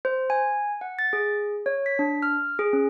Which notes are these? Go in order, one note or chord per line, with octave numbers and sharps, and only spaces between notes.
C5
G#5
F#5
A6
G#4
C#5
B6
D4
F6
G#4
C#4